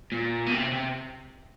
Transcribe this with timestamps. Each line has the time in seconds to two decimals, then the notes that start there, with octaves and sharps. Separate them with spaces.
0.12 A#2
0.47 B2
0.52 C3
0.72 C3